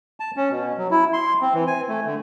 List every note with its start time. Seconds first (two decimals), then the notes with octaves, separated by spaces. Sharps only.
0.20 A5
0.37 C#4
0.50 B2
0.78 F#3
0.91 E4
1.13 C6
1.41 C4
1.54 E3
1.67 G#5
1.89 A3
2.05 D3